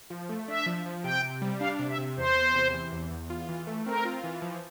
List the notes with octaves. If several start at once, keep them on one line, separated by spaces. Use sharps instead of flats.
F3
A3
D4 E5
F3
F3
C3 G5
C3
G3
D4 F5
C3
E5
C3
E2 C5
E2
C3
E3
E2
E2
F4
E3
A3
C4 A#4
F4
E3
F3